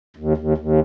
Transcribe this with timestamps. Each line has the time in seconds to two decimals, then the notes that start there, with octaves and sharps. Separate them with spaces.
0.17 D#2
0.37 D#2
0.58 D#2